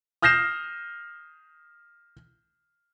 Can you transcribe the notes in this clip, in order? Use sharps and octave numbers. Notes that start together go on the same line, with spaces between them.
D#6 F6 G6 A#6 C7 E7